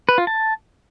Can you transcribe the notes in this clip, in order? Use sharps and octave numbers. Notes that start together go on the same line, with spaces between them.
B4
F4
A5